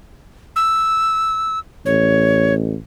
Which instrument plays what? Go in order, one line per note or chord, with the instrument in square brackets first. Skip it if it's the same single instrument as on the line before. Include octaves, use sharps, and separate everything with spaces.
[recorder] E6
[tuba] A1 [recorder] C#5